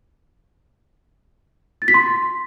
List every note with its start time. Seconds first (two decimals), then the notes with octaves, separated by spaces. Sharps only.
1.82 A6
1.88 B6
1.94 C6